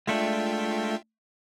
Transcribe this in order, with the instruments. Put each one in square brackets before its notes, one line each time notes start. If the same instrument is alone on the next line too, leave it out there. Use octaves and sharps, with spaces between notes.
[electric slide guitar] G#3 A3 D4 [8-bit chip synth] F4 E5 G5